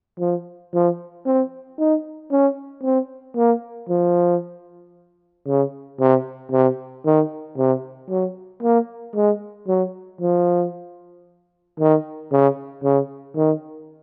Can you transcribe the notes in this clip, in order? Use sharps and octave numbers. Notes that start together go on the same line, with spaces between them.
F3
F3
C4
D#4
C#4
C4
A#3
F3
C#3
C3
C3
D#3
C3
F#3
A#3
G#3
F#3
F3
D#3
C#3
C#3
D#3